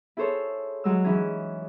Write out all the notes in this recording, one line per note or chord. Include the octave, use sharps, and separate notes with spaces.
E4 G#4 A4 C5 C#5
F#3 G#3 E6
E3 C#4 D#4 G#4